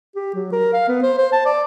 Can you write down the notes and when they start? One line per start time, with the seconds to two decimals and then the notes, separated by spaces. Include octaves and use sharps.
0.16 G4
0.35 F#3
0.53 A#4
0.73 F5
0.88 B3
1.03 C5
1.18 C5
1.32 A5
1.45 D5